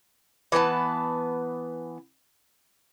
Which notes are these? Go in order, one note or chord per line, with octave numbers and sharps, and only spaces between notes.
E3 B3 B4 A5